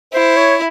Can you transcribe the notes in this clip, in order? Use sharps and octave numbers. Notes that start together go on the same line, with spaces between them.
E4 C5
C#5